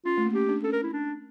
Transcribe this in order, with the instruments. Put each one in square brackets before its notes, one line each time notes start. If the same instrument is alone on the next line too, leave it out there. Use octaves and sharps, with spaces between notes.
[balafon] C#4 [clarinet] F4
[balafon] A3
A#3
[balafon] C#4 [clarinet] G4
[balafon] D4
[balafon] C#4 [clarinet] A4
[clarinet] A#4
E4
D4